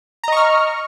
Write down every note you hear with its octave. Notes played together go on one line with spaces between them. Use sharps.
D#5 A#5 C#6 F6